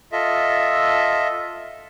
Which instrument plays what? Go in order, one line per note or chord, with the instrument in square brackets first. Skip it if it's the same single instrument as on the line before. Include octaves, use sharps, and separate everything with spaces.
[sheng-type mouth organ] F4 A4 D#5 E5